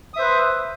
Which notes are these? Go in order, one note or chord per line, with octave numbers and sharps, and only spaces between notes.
B4 C5 E5 D#6